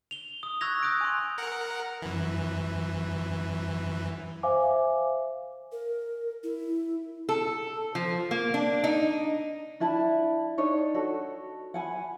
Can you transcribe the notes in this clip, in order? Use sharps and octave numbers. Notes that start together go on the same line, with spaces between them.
F7 G7
D#6
C#6 E6 F#6 G#6 A#6 F7
D#6 F#6 G6 D7
G#5 C6
A#4 F#5
F#2 E3
C5 E5 F5 G#5 D6
A#4
E4
A4
F3
A#3
D4
D#4
D4 E4 A5 B5
D4 D#4 C#5 D5
F#4 A4
F#5 G#5 B5